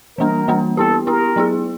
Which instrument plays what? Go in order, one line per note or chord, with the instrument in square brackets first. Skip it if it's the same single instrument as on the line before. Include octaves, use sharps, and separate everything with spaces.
[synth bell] E3 G3 A#3 D4 [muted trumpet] A#4
[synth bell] E3 G3 A#3 D4
[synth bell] B3 E4 G4 [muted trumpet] A4
[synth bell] B3 E4 G4 [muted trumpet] A#4
[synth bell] F#3 B3 E4 G#4